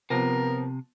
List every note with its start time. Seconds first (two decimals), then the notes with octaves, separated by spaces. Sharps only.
0.10 C3 F3 B3 A#4